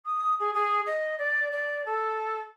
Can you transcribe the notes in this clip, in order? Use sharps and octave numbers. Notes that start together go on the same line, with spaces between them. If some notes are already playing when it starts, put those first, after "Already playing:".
D#6
G#4
G#4
D#5
D5
D5
A4